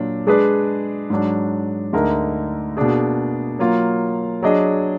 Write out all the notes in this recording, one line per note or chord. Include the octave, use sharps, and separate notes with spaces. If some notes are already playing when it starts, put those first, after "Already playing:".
Already playing: A#2 F#3 D4
G#3 D4 G#4 B4 D5
G#2 F#3 D4
D2 D3 G#3 D#4 A#4
B2 A#3 D4 G#4
F#3 A#3 F4
F#3 D4 G#4 D#5